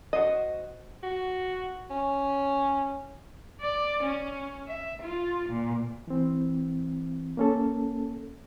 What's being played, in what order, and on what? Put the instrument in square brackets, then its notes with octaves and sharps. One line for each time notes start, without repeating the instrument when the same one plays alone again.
[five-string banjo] F#4 C5 D#5
[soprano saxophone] F#4
C#4
[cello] D5
C#4
E5
F4
A#2
[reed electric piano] E3 C4
A#3 C#4 A4